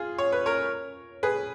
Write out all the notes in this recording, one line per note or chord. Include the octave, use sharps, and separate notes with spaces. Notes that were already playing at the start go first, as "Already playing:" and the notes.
Already playing: F4 G#4
C#5
B4
A#4 C#5
G#4 B4